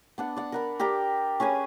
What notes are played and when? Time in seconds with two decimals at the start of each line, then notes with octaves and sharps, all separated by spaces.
0.18 B3 D4 F#5
0.37 D5 F#5
0.52 A#4 F#5 B5
0.79 G4 A#4 D5 G5
1.40 C#4 G#4 B4 G#5